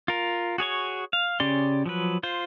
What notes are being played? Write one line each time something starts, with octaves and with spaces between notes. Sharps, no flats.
F4 A#4
F#4 G#4 C#5 C#6
F5
C#3 C#4 G4 D5 C6
F3 F#3 B4
F4 C5